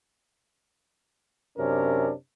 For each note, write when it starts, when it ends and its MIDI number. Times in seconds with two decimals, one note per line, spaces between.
1.59 2.13 42
1.59 2.13 48
1.59 2.13 61
1.59 2.13 62
1.59 2.13 70